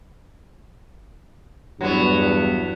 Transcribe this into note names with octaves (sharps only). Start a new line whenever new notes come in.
E2 G2 F#3 B3